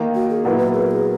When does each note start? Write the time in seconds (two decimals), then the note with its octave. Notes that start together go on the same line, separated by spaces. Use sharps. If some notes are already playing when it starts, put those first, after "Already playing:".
Already playing: D#3 A#3 D#4
0.15 F#4
0.30 G#4
0.44 A#2 F#3 B3 E4 A#4
0.58 B4
0.73 G#4
0.83 A#4
0.91 G#4